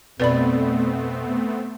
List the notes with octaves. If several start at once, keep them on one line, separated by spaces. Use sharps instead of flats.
F2 B2 A3 B3 C4 B4 D5 B5